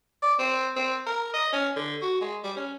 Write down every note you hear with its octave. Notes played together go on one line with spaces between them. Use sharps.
D5
C4
C4
A#4
D#5
C#4
D3
F#4
G#3
G3
C#4